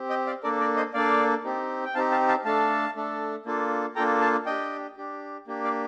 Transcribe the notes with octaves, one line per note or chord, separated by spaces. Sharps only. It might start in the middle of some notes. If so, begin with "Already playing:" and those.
Already playing: C4 G4
D#5 G5
D5 F5
A#3 D4 A4 A#4 D5
A#4 D5
C5 D#5
A#3 D4 A4 D5 F5
C4 D#4 G4
G5
C4 D#4 G4 F5 A5
F5 A5
F5 A5
A3 D4 A4 F5 A5
A3 D4 A4
A#3 D4 F4 A4
A#3 D4 F4 A4 G5 A#5
F5 A5
D4 G4 D#5 G5
D4 G4
A#3 D4 G4
D5 F5